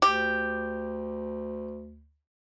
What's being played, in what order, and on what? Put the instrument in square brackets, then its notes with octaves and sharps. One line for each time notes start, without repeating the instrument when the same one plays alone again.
[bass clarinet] D2 [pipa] G4